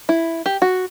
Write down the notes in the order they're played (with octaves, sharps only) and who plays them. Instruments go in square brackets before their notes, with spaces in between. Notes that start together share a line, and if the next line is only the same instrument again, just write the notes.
[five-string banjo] E4
G4
F#4